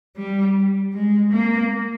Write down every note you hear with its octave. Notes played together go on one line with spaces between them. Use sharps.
G3
G#3
A#3